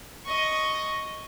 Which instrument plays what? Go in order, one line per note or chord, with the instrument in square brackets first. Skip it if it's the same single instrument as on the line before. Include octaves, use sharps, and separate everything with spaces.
[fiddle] D#5 C#6